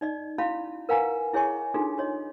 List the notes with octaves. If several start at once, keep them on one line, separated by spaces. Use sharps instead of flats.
D#4 D5 D#5
C#4 E4 F#4 F5 B5
A#4 B4 F5 F#5 G#5 A#5
E4 G#4 C#5 D#5 G#5 C#6
D4 D#4 F4 F#4 G#4 A4
F#4 C#5 D#5